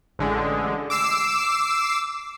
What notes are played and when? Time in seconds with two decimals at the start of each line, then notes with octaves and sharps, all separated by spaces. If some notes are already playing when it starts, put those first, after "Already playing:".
0.19 A1 D3 G#3
0.90 D6 E6 C7 E7